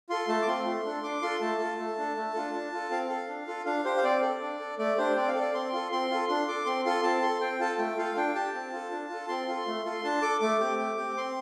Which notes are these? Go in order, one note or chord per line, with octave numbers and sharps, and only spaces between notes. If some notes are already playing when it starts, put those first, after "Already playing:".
F4 A4 C6
A3 A5
D6
C4 F4 C6
A3
D4 A4
D4 D6
F4 A4 C6
A3 A5
F4 A4
A3
D4 A4
A3
D4 F4 A4
D4
F4 A4
C4 F5
A4
D4
F4 A4
D4 F5
G4 C5
F5
C4 D5
A4
D4
A4
A3 D5
D4 G4 C5
C4 D5
F5
A4 D5
C4 C6
F4 A4
C4 C6
F4 A4
D4 C6
A4 D6
C4 C6
F4 A4 C6
C4 A5
A4 C6
C4 G5
F4 A4 A5
A3 G5
F4 A4 F5
D4 G5
G4 A5
C4
F4 A4
D4
F4 A4
C4 C6
F4 A4
A3
F4 A4
D4 A5
A4 D6
A3 D6
C4 G4
A3
C4 G4
C4 C6